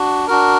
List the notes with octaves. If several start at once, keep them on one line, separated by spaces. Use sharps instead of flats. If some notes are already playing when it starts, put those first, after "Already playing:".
Already playing: D4 F#4
D4 F#4 A#4